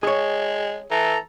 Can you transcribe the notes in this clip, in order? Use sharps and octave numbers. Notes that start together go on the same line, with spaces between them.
G#3 G#4 C#5
E3 A4 A#5